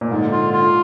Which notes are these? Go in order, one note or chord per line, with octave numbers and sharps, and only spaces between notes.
A#2
G#2 D3
F4
F4